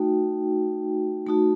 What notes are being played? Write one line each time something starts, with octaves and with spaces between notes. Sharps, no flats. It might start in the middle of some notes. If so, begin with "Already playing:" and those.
Already playing: A3 D#4 F#4 G5
A3 D#4 F#4 A5